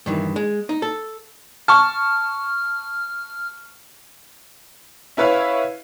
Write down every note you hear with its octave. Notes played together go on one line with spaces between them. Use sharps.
G2 D#3 E3
G#3
D#4
A4
A5 C#6 F6
C#4 E4 B4 C#5 F5